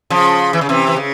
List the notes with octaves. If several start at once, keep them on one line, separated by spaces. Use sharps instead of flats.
C#3 F3
E3
C#3
C3 E3
E3
C#3